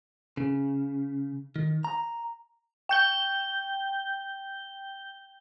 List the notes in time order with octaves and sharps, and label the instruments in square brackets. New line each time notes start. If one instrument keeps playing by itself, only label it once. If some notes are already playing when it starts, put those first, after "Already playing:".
[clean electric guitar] C#3
D#3
A#5
[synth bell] G5 G6 G7